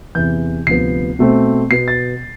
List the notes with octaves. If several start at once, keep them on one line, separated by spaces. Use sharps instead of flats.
E2 C3 E3 G6
D2 C3 F3 B3 C7
B2 A3 C4
B2 B3 C7
A6